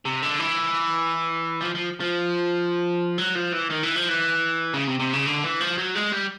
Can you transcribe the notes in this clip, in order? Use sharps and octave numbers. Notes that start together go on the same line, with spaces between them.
C3
D3
E3
F3
F3
F3
F#3
F3
E3
D#3
E3
F3
E3
C#3
C3
C3
C#3
D3
E3
F3
F#3
G#3
G3